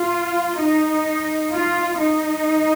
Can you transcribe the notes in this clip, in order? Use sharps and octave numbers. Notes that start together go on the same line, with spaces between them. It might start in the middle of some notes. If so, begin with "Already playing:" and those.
Already playing: F4
D#4
F4
D#4